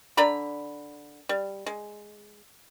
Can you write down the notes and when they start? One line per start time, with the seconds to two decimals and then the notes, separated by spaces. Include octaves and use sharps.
0.17 D3 D5 A#5 B5
1.29 G3
1.67 G#3